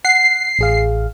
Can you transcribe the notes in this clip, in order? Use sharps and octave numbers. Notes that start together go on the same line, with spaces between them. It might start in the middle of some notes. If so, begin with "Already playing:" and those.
F#5 C7
A1 G#4 F5